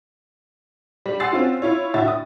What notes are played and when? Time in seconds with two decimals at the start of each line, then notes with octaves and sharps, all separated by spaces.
1.06 G3
1.20 F#5 G#5 C6 E6 A6 C7
1.31 C4 C#4 F4 F#4
1.62 E4 F4 C#5
1.94 D2 A2 F#4 E5 A6
2.08 D#6